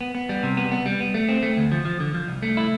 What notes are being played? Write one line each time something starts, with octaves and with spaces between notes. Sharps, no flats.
B3
B3
G3
C3
B3
B3
G3
B3
A3
C4
A3
D2
F3
F3
D3
F3
C2
A3
E4